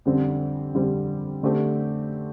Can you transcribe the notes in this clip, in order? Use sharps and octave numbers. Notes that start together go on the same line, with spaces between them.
F2 D3 G3 C4
F2 D3 G3 C4
D3 A3 C4 G4